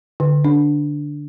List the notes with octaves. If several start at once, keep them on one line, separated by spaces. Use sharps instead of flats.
D3
D4